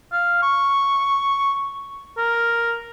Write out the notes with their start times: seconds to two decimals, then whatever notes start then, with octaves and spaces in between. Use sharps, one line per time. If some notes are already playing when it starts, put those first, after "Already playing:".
0.12 F5
0.42 C#6
2.17 A#4